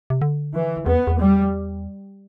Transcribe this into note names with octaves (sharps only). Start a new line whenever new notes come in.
C3
D3
E3
E2 B3
E2
G3